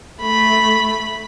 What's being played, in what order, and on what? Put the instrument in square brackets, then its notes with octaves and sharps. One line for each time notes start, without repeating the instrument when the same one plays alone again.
[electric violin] A3 B5